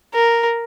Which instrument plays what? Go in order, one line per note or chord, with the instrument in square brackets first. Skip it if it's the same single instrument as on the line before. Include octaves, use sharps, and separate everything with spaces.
[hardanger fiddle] A#4